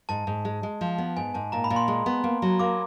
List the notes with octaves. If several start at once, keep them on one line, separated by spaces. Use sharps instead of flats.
G#2 A5
G#2
G#3
G#3
F3
B3
G#2 G#5
G#2 A5
A#2 A#5
B5
A#2
C6
G#3
B3
A#3
F#3
A#3 D6